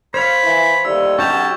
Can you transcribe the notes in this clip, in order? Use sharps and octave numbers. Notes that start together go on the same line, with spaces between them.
C5 C#5 F5 B5 G#6 F7
E3
D#2 A2 G3 E6
B1 C#4 F#4 G4 A5 C#6 G6 F7